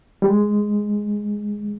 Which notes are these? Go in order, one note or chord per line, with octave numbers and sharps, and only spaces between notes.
G3
G#3